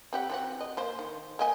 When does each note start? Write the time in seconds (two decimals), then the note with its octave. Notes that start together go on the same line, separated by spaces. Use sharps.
0.13 C4 G4 F#5
0.30 E3 C4 F#4
0.61 D#5
0.77 A#3 C5
0.99 D#3
1.39 A#3 D#5 G#5